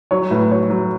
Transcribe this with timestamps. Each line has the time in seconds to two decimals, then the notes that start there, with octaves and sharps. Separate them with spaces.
0.11 F#3 C#5
0.31 A2 B4
0.51 F#3 C#5
0.70 F#3